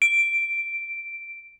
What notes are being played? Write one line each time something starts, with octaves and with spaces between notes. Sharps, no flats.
D7